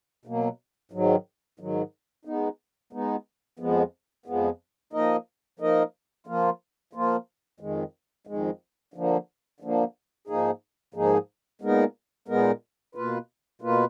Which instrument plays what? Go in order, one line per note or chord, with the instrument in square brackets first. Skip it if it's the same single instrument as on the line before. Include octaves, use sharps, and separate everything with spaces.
[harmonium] B2 F#3 A#3
G#2 D#3 F#3
G#2 D#3 F#3
G#3 B3 D#4
G#3 B3 D#4
F2 F3 G#3 B3
F2 F3 G#3 B3
F3 A#3 D#4 A#4 D#5
F3 A#3 D#4 A#4 D#5
F3 A#3 F4
F3 A#3 F4
F2 D#3 G#3
F2 D#3 G#3
D3 F3 A#3
D3 F3 A#3
G#2 F3 A#3 D#4 G#4
G#2 F3 A#3 D#4 G#4
A#2 G#3 B3 D#4 A#4
A#2 G#3 B3 D#4 A#4
B2 A#3 F4 B4
B2 A#3 F4 B4